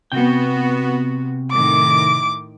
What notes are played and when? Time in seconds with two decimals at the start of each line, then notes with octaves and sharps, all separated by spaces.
0.12 C3 B3 F#4 G5
1.51 A2 D#3 D6